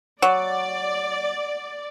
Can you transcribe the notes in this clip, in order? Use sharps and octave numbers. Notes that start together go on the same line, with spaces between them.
F#3 D5 F#5